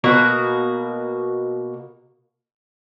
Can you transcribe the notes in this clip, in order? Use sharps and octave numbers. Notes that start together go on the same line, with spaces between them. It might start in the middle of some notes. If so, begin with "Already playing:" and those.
B2 A#3 F#4 A#5